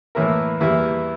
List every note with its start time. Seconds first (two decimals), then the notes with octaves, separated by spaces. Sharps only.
0.15 A2 E3 A#3 E4 A#4
0.60 E2 E3 G3 A#3 E4